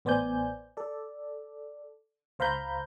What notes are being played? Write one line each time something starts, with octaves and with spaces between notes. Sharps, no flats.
A1 B3 C5 D5 G#5 G6
A4 D5
C#2 C5 F5 A#5 B5 G6